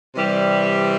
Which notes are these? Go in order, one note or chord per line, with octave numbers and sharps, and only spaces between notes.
C3 E3 G3